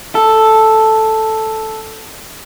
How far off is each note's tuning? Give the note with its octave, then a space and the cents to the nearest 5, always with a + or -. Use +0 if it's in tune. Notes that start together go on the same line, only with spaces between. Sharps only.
A4 +0